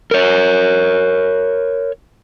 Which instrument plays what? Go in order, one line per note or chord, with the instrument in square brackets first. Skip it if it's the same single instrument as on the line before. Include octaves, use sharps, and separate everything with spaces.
[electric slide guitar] A#4 C#5